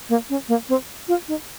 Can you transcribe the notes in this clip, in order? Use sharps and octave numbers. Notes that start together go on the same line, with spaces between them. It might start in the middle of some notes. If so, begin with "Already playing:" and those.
A#3
C#4
A#3
C4
F4
D#4